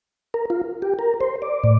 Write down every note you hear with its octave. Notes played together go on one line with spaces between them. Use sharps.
A#4
F4
G4
A#4
C5
D5
A2